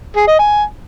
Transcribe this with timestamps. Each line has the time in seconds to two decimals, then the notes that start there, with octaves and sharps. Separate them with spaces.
0.16 G#4
0.28 D#5
0.39 G#5